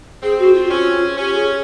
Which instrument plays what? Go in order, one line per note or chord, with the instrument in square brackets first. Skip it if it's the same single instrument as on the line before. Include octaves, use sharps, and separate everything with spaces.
[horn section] C4 [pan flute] G#4
[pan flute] F#4
F4
[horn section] C#4
[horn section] C#4 [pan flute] G4
[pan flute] G#4